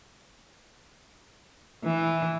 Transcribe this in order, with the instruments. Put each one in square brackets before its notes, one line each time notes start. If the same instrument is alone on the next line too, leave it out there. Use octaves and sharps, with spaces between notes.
[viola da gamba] E3